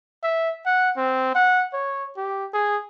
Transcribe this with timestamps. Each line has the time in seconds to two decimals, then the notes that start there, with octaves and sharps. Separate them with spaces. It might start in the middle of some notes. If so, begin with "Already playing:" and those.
0.23 E5
0.66 F#5
0.97 C4
1.35 F#5
1.73 C#5
2.17 G4
2.53 G#4